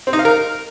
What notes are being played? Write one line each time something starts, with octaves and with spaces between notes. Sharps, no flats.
C4
D#4
F5
A#4